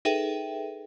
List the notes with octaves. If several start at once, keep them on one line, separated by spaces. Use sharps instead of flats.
D#4 G#4 A4 B4 E5 G5